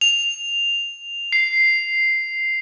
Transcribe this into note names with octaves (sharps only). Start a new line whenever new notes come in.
F7
C7